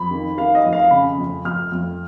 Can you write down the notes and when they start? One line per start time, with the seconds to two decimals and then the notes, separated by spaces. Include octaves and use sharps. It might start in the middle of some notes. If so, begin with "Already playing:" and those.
Already playing: F2 B5
0.11 D#3
0.37 D#3 F5
0.55 D#5
0.64 F2
0.73 F5
0.91 C#3 B5
1.18 F2
1.45 F2 F6
1.72 F2